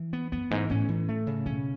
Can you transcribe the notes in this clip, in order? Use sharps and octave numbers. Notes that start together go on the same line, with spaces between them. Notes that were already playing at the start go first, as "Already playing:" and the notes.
Already playing: E3
B3
F#2 B3
G#2 E3
A2 C#4
E3
A3
C#3
B2 C#4